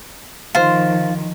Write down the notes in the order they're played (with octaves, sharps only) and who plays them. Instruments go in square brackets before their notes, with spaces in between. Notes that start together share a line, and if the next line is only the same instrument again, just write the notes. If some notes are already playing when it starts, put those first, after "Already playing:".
[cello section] D#3 F3 [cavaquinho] F4 C5